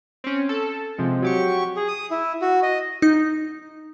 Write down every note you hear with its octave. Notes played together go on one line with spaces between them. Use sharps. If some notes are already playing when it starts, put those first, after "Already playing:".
C4 C#4
A4
C3 F3 G#3
F#3 G4 C#6
G#4
D#6
E4
F#4
D#5
D#4